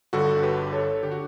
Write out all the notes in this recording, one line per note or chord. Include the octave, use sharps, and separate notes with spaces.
G1 G2 D3 F#4 A4
G4 B4
A4 C#5
D3 G4
F#4